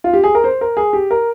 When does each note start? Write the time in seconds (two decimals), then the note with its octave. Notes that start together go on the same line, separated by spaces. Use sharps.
0.04 F4
0.13 G4
0.24 G#4
0.35 A#4
0.44 C5
0.61 A#4
0.77 G#4
0.93 G4
1.11 A#4